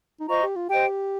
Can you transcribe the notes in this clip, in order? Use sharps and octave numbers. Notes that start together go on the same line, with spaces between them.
D#4
F4 C5 D#5 A#5 C#6
G4
F4
G4 C5 D#5 G5